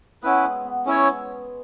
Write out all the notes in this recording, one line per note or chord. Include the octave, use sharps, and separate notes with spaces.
B3 C#4 E4 B4
G#3
B3
G#3 C#4 E4 C#5